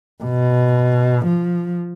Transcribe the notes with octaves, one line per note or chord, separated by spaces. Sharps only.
B2
F3